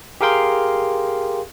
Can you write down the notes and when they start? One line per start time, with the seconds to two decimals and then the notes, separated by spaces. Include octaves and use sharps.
0.21 G4 G#4 A#4 F5 G5 C6